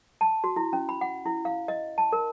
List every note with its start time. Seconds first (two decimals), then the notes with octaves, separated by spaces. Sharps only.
0.21 A5
0.44 F#4
0.56 E4
0.73 C#4
0.89 B5
1.01 F#5
1.26 E4
1.45 F5
1.68 D#5
1.98 A5
2.13 A#4